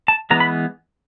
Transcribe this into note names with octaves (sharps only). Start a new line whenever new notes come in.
A5
E3 G#3 B3 A#5
B5